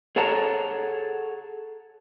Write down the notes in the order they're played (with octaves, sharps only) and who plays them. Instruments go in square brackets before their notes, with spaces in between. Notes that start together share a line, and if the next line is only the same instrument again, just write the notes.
[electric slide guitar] G#4 A4 C#5 F#5 A5 A#5